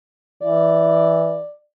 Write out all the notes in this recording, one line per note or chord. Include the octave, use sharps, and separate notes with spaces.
E3 D5